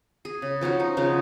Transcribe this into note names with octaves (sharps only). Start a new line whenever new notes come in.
G#4
C#3
F3 C#4 D#4 F#4
D#4
C#3 F3 C#4